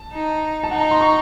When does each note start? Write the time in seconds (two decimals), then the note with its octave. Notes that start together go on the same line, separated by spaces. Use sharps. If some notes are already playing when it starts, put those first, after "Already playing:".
Already playing: A5
0.13 D#4
0.63 A5
0.71 D#4 F#5
0.81 A#5
0.91 C6
1.01 C#6